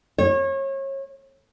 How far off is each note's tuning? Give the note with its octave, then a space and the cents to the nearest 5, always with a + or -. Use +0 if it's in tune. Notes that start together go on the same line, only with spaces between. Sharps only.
C#5 -30